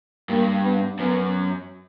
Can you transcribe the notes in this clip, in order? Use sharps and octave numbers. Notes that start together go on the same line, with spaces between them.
G2 A#3
B3
F#2 B3